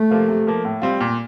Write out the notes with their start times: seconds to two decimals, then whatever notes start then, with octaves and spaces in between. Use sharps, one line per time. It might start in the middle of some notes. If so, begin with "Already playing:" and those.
Already playing: A3
0.11 C3 F3 A#3 F4
0.29 C3
0.47 F3 A#3
0.65 A2
0.82 G3 C4 F4
1.01 A#2